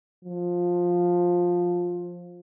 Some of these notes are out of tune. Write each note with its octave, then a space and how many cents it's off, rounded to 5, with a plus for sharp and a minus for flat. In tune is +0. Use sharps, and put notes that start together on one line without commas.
F3 +10